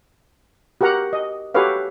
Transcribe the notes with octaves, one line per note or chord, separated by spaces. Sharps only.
F#4 G4 A#4 F#5 A#5
D#5
F#4 G4 A4 B4 C#5 F5